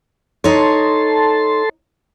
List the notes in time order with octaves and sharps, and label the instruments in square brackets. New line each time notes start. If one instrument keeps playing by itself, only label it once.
[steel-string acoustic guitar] D#4 C#5 [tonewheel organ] A4 A5 C6